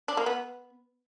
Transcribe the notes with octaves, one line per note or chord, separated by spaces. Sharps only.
D4
A#3
B3